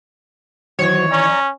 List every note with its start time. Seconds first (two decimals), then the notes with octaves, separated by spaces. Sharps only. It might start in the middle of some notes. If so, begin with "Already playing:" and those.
0.79 D#3 E3 F#3 C5 C#5
1.12 C#4 D5 A#5